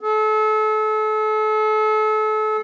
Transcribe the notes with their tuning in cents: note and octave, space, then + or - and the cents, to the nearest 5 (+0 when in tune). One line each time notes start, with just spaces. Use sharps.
A4 -35